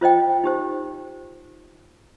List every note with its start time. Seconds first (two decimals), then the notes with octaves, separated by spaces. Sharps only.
0.01 F4 C5 D#5 G5
0.44 D#4 G4 C5